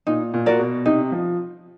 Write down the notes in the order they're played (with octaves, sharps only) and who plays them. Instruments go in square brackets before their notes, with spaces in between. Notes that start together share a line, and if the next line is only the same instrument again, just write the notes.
[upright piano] A#2 [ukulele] D#4
[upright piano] A#2
[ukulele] F#4 A#4 D5
[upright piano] B2
[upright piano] C3 [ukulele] D#4
[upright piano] F3